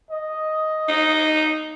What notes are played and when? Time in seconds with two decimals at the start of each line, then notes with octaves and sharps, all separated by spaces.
0.11 D#5
0.89 D#4